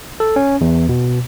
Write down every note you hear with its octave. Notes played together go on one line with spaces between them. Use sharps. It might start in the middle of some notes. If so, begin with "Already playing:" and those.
A4
C#4
E2
B2